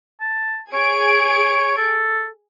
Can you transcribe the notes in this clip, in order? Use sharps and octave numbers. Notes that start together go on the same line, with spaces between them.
A5
G#4 C#5 G#6 D7
A4